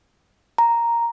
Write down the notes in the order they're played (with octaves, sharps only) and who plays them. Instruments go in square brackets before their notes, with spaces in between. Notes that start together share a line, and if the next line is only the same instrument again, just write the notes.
[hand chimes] A#5